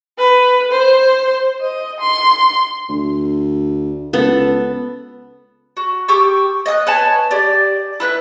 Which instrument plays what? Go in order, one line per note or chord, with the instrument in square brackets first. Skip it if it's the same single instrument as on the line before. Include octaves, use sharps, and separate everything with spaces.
[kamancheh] B4
C5
D#5
C6
[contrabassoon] D2
[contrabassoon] C#2 [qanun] B3 A4
[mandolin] F#4
G4 G5 C#6 E6
D#5 E5 D#6 F#6
B4 C#5 G#5 A5
G4 D5
E4 B4 F#6